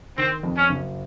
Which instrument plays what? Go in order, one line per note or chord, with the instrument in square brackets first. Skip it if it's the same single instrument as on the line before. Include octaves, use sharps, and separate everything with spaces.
[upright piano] D#3 [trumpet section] C4
[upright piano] F2
[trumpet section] C#4
[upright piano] F#1